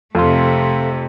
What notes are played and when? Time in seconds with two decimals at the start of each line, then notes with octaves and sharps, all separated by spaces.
0.15 F2 C3 A3 A4 F5 C6